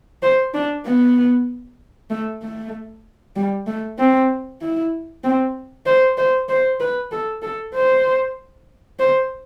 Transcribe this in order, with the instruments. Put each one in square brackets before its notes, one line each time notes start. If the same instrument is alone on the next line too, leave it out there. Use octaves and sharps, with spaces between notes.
[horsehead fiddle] C5
D4
B3
A3
A3
G3
A3
C4
E4
C4
C5
C5
C5
B4
A4
A4
C5
C5